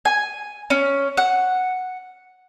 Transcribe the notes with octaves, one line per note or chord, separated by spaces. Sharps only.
G#5
C#4
F#5